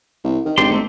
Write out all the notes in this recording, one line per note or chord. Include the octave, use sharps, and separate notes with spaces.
C2
D#3
G#1 D4 G4 C6
A3 A#3 C4